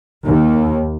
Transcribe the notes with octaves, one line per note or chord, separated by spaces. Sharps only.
D#2